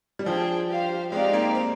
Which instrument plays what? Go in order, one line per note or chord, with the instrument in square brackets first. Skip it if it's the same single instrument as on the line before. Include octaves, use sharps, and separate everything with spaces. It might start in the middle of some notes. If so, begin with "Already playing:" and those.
[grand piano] G3
[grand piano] F3 [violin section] D4 G#4 C5 G5
[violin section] G4 C5 F5
[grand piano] G#3 [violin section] C4 D#4 G4 D5 F5
[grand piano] A#3
C4